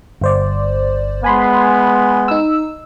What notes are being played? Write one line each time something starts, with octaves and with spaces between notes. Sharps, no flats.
G1 C5 D5
G#3 B3 G#5 B5 C6
D#4 E6